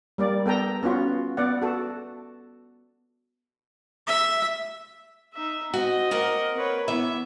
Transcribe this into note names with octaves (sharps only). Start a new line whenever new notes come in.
G3 A#3 D5
B3 A4 G5 A#5
B3 C#4 F4 F#4
B3 D5 F#5
F#4 A4
E5
D#4 E5
C4 F#4 D#5
A#3 A#4 F#5
B4 C#5
E3 B3 E5